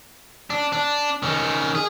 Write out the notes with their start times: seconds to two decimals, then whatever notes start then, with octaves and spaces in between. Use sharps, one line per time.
0.50 D4
0.72 D4
1.23 D#3 C#4
1.75 G#4